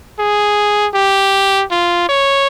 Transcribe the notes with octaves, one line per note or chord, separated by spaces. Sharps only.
G#4
G4
F4
C#5